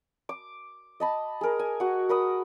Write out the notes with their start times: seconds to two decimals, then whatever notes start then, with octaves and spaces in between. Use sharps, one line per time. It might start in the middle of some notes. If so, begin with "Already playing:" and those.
0.29 D6
1.00 D#5 A5 B5
1.41 G#4 A#4
1.59 G#5
1.80 F#4 F#5
2.09 A#4 B5 D#6